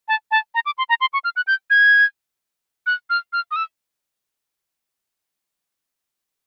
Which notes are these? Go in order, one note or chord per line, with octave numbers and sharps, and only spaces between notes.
A5
A5
A#5
D6
C6
A#5
C6
C#6
F6
F#6
G6
G#6
F#6
F6
F6
D#6
E6